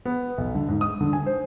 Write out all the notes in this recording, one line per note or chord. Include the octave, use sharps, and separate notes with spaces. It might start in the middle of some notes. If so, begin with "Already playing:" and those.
B3
B1
D3
G#2
D#6
D3
G#5
C5